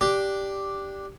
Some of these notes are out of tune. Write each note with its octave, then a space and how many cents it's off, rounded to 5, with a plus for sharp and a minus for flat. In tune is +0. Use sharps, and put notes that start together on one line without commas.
D4 +0 G4 +0